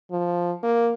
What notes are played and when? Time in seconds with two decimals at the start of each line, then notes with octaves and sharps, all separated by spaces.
0.11 F3
0.63 A#3